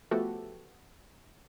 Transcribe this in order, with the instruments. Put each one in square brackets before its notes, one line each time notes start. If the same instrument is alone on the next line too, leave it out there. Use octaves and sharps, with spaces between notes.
[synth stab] F3 A3 B3 F#4 G4 A4